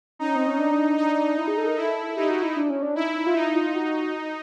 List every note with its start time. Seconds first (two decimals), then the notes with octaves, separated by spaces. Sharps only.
0.19 C#4 D#4
0.36 C4
0.47 C#4
0.59 D4
0.98 D4 D#4
1.38 E4
1.48 G#4
1.57 A4
1.67 A#4
1.77 E4 A4
2.16 D#4 G4
2.29 F#4
2.43 E4
2.56 D4
2.70 C#4
2.82 D4
2.95 D#4 E4
3.27 F4
3.35 D#4 E4
3.55 F4
3.75 F#4